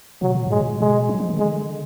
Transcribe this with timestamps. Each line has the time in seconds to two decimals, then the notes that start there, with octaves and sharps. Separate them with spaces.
0.22 B2 F#3
0.35 A#2
0.47 G#2 G#3
0.60 A#2
0.80 B2 G#3
1.09 F#3
1.20 F3
1.29 D#3
1.38 D3 G#3